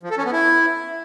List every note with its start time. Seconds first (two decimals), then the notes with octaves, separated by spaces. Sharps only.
0.03 F3
0.10 A4
0.18 C#4
0.25 B3
0.32 E4